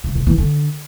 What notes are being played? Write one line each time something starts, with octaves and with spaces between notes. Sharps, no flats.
C#3
C3
E3
D3